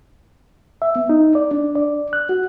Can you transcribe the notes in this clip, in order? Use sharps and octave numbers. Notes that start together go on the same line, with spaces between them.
E5
B3
D#4
D5
D4
D5
F#6
F#4